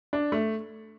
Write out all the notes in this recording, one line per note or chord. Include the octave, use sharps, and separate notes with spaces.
D4
A3